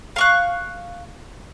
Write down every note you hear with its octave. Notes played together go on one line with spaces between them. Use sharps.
F5 C#6 F#6